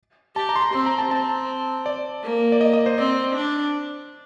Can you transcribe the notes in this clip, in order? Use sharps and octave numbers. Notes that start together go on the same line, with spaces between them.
G4 A5
A#5
C6
A#5
C4 C6
A#5
A5
C4 A5
D5
A#3
D5
D#5
D#5
C5
C4 D5
D4